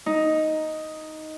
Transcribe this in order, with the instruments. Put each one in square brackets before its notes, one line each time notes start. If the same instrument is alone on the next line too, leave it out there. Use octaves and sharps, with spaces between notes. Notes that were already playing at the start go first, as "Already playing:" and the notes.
[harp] D#4